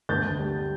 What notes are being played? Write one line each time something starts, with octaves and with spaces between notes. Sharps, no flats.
D2 G6 A6
D2
G3